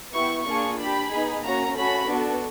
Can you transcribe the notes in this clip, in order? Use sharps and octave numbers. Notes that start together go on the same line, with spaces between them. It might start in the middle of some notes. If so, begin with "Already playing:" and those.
B3 E4 G4 C#6
A#3 D4 F4 G#4 C#6
D4 G4 B5
B3 D#4 G#4
A#3 C#4 F#4 A#5
A3 C#4 F#4 A4 B5
B3 D4 F#4 A4